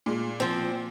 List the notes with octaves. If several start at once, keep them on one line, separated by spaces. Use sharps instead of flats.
A#2 G#3
F3 C4